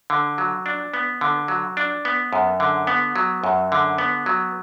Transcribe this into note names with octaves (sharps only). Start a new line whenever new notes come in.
D3
F#3
D4
B3
D3
F#3
D4
B3
F#2
D3
B3
F#3
F#2
D3
B3
F#3